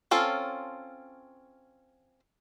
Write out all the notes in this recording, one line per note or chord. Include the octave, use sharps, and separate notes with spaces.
C4 C#4 F4 A4